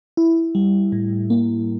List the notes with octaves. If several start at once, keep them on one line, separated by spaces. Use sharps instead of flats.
E4
G3
A2
A#3